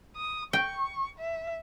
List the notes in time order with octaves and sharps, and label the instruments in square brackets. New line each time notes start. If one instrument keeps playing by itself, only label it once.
[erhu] D#6
[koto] G5 [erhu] C#6
[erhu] E5